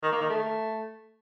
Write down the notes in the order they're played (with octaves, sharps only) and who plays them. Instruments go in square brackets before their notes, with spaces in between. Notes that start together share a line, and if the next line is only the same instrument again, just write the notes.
[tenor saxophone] D#3
A#3
D#3
A3